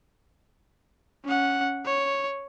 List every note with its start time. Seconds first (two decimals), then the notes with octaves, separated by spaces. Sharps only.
1.25 C#4 F#5
1.85 C#5